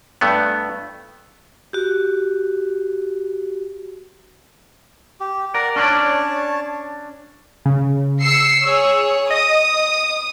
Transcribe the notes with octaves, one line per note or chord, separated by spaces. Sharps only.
G2 A3 B3
F#4 G4
G4
A#4 D5 F#5
C#4 D4 C#5 D5 A5
C#3
E6 C7 C#7
G#4 C#5 E6
D#5 D#6